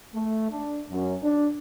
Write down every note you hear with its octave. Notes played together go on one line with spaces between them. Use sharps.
A3
D4
F#2
D4